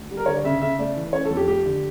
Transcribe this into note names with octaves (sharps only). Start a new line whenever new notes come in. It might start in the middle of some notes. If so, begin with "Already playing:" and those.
Already playing: D2
G3
A#4
D3 C#5
D5
C#3 E5
C#3 E5
A3 D5
E3
C#4 C#5
A4
F2
G4
A3 G4
D3